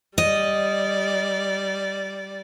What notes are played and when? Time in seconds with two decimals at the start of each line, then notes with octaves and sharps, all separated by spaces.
0.18 G3 D5 D#5